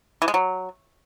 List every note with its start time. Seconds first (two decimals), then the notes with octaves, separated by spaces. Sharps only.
0.22 E3
0.28 G#3
0.34 F#3